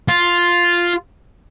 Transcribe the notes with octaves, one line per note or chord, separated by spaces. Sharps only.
F4